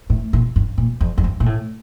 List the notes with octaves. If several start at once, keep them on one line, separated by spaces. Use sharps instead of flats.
A2
A#2
G2
A#2
F2
F2
G2
A#2
A2